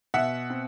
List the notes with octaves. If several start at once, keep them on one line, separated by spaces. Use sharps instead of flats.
B2 E5 F#5
C4